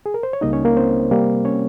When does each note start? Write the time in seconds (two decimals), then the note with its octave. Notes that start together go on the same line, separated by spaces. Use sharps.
0.06 G#4
0.14 A#4
0.23 C5
0.33 C#5
0.41 C#2 C#3 G3 A#3 D#4 D#5
0.53 C#4 C#5
0.65 A#3 A#4
0.76 C4 C5
1.11 C3 G3 A#3
1.45 C#4 C#5